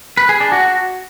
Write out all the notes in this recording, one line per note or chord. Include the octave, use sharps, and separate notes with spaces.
B4
G#4
D4
F#4